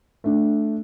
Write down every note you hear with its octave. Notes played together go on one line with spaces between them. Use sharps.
A3 D4